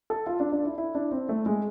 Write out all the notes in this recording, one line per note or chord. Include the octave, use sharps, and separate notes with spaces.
A4
F4
D4
D4
E4
E4
D4
C4
A3
G#3